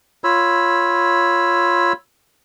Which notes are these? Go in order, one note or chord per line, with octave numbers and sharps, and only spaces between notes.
F4 C#5 B5 E6